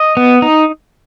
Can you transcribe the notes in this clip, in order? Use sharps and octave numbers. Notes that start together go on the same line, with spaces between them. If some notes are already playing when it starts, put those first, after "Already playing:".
Already playing: D#5
B3
D#4